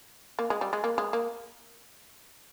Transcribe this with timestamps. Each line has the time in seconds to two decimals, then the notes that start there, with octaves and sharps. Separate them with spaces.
0.39 A#3
0.50 G#3
0.61 G3
0.73 G#3
0.84 A#3
0.98 G#3
1.13 A#3